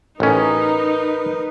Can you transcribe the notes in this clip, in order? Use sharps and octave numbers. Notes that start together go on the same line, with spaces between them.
A1 C#4 D#4 A#4 B4